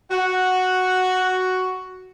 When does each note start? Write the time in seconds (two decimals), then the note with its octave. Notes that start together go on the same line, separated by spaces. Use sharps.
0.11 F#4 F#5